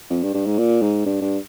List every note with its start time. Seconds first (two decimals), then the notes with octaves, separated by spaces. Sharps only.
0.10 F2
0.23 G2
0.34 G2
0.46 G#2
0.58 A#2
0.82 G#2
1.06 G2
1.21 G2